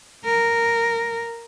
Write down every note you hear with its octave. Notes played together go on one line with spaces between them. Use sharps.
A#4